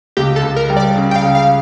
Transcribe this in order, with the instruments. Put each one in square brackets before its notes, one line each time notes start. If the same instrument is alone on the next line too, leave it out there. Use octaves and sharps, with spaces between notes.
[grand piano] C#2 [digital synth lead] G4
[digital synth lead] A4
[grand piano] C#2
[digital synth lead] A#4
[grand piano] G3
[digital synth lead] D5
[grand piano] C#3
[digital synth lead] G5
F5
[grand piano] C#3
[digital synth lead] F5